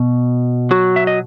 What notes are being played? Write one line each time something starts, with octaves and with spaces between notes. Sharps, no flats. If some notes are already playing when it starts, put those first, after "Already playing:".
Already playing: B2
F#3 F#4
E5
D#5